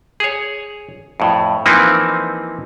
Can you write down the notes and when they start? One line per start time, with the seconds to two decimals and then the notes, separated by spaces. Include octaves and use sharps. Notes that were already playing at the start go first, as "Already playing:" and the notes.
0.20 G#4 C#5
1.20 F2 A2
1.66 E3 F3 A#3 C4 D#4 E4